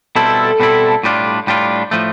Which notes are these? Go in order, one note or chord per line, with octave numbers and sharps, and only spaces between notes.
B2 G3 C4 E4 A4
B2 G3 C4 E4
A2 G3 D4 F4
A2 G3 D4 F4
A2 F3 A3